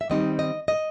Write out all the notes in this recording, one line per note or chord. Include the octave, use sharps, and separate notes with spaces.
E5
D#3 G3 C4 D#4 D#5
D#5
D#5